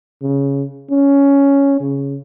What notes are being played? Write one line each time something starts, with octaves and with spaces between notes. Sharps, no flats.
C#3
C#4
C#3